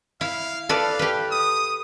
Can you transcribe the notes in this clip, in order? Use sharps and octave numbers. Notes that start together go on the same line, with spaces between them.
E4 F5
A4 B4 D5 F5
G4 B4
D#6